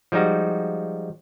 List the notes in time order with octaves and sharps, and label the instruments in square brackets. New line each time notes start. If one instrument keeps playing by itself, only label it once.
[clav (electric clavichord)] F3 G3 G#3 D#4 F#4